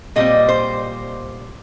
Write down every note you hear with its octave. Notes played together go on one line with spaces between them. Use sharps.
A#2 G3 C4 D#5
C5